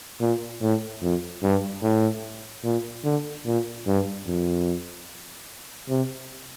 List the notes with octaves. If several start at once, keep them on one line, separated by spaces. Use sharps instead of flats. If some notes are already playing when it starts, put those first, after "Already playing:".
A#2
A2
F2
G2
A2
A#2
D3
A#2
G2
F2
C3